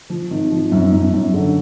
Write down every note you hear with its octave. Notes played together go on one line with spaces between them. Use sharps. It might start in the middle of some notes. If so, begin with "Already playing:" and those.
F3
G#1
F3
F#2
F#2
F#2
D3